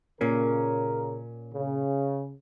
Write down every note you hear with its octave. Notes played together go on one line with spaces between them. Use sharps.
A#2 C#3 A#3 C#4 A#4
C#3